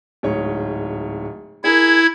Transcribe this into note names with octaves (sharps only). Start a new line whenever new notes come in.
D1 G#2 C#5
E4 G#4 A#4 G#6